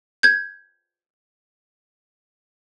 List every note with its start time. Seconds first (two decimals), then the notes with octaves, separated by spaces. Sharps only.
0.23 G6 G#6